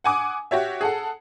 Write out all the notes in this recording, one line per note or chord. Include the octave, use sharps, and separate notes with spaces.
F#5 G#5 D6 D#6
F#4 G4 C#5 E5
G#4 A4 F#5